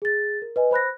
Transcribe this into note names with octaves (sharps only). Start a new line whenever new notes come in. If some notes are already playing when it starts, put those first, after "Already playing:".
G#4 A6
A#4
B4 D#5 G#5
C5 B5 F#6 A#6